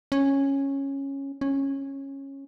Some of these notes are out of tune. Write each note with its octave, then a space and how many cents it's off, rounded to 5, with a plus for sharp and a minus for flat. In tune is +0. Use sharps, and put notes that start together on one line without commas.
C#4 -10
C#4 -15